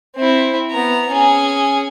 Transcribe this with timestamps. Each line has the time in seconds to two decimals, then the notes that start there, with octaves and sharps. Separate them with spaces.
0.16 C4 E4
0.71 B3 A#5
1.09 C#4 G#4